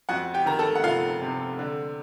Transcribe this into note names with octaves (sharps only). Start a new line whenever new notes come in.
F2 F#4 F#5
G4 G5
D#3 A#5
A4 A5
F#5
F1 F4 F5
C3
D3